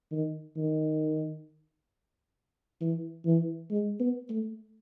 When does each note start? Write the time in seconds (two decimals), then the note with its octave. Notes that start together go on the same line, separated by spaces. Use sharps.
0.11 D#3
0.57 D#3
2.81 E3
3.25 E3
3.71 G#3
4.00 B3
4.30 A3